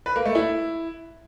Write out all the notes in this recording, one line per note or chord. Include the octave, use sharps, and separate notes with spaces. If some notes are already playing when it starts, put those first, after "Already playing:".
B4
A#3
A3
E4